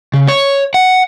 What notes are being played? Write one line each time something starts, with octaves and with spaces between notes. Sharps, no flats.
C#3
C#5
F#5